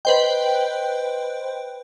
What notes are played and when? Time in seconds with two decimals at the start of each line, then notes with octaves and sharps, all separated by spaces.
0.05 B4 C5 D#5 G5